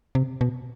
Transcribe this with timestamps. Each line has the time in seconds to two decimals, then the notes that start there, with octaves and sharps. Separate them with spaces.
0.15 C3
0.41 B2